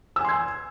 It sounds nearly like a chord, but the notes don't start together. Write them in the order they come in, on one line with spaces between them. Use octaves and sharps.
E6 G#5 C6 G#6